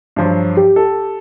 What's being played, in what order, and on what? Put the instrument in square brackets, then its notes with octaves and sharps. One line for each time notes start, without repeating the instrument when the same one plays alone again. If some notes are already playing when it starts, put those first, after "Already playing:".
[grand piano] G2 F3 F#3
[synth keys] G4
[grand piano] A4